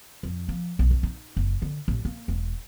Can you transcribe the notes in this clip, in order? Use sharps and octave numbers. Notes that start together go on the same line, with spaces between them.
F2
F3
B1
F2
D#4
F#1
D3
A1
A#3
E1